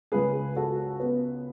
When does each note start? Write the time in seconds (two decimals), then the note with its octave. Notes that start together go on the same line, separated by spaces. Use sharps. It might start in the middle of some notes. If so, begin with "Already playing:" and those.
0.12 C#2 C#3 G#3 G#4 B4
0.56 F#4 A4
1.00 B3